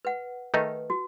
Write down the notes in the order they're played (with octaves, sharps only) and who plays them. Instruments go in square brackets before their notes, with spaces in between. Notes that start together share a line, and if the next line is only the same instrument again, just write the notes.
[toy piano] B4 F#5
[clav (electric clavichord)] D#3 A3 D#4 [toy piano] B4
[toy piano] F#4